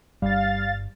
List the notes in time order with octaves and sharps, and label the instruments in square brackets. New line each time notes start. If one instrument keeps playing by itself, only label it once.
[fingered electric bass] G1 G2 [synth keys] G3 [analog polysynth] F5 A6